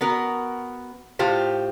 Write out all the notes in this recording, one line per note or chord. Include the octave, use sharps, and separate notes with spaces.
B3 F#4 A#4
A2 F4 G4 C5